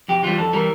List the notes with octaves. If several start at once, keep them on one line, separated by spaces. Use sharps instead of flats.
F2 G4
E3 G3 F4
F2 A4
E3 G3 A#4